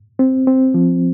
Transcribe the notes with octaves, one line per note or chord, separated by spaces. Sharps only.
C4
C4
F3